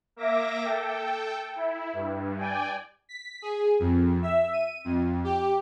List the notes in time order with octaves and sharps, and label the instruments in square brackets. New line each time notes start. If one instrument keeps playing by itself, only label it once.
[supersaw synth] A#3 E5 D6 A#6
A4 G5
E4
G2
D5 G5 G#5
B6
G#4
F2
E5
D#7
F2
G4